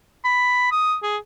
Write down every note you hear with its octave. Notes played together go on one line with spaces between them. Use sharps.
B5
D#6
G#4